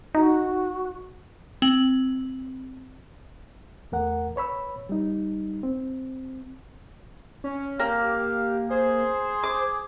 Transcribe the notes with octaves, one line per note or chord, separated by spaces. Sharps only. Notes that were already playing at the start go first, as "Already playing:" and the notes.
D#4 F#4
C4 F#7
E2 A3 A#4 F#5
B4 C#5 B5 E6
G3 D#4
C4
C#4
A#3 G4 F5
G#4 C5
D6